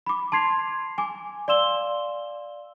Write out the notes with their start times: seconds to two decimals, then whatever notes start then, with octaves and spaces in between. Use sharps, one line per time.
0.06 B5 D6
0.32 A5 C6 G#6 C7 F7
0.98 G#5 D6
1.48 D5 F5 C6 E6 E7 G7